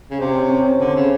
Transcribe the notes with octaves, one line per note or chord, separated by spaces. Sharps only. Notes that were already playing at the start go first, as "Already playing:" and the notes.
C#3
C3 C4
C#4
C#4
C4
D3
C#3